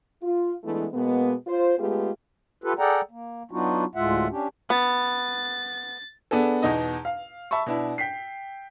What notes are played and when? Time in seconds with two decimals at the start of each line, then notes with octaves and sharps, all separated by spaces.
0.23 F4
0.64 E3 G#3 A3 B3 D4 E4
0.94 B2 G#3 A#3 B3
1.47 F4 C5
1.79 G#3 A3 B3 F4 G4 G#4
2.64 F4 G4 A4 B4
2.79 G#4 A4 D5 F#5 G5 A#5
3.11 A#3
3.51 F#3 B3 D4 D#4 F4 F#4
3.95 D2 A2 G#3 F4 E5 F#5
4.31 C#4 D4 G4
4.70 B3 A6
6.31 B3 D4 G#4 A4
6.63 E2 B2 D#4 D#5
7.05 F5
7.51 E5 A5 B5 C#6
7.67 B2 D4 E4
7.98 G5 B6 C7